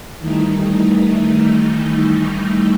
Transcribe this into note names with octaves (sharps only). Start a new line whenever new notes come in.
D#3 E3 G3 A3 D#4